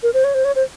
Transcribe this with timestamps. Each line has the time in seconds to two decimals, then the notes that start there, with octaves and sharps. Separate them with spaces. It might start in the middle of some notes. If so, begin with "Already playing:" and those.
0.03 A#4
0.14 C5
0.24 C#5
0.34 C5
0.44 C#5
0.55 C5